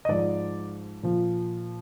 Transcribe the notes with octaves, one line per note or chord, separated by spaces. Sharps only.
D#5
G#2 F3 D5
A#2 F3